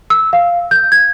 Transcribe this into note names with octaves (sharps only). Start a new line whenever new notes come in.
E6
F5
G6
G#6